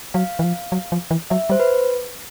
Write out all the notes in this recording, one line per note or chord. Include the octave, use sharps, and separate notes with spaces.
F#3 F5
E3
F3
F#3
F3
E3
F#3 E5
G3 C5
B4